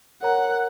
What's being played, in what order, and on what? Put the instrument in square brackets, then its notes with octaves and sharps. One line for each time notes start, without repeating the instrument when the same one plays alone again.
[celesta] A#4 C#5 A#5 [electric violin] F#5